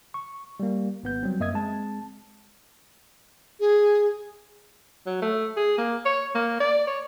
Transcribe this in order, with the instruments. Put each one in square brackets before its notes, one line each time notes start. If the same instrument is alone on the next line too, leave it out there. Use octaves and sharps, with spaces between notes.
[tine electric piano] C#6
G3 A#3
G#1 B3 G6
F#3 G3 C4
F#2 A#3 D#5 E5 D#6 G#6
G#3 C4 A5
[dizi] G#4
[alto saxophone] F#3
A3
G#4
A#3
C#5
A#3
D5
C#5